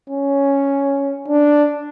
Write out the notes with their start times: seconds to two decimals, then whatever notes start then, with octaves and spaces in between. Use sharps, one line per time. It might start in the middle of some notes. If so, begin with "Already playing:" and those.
0.10 C#4
1.28 D4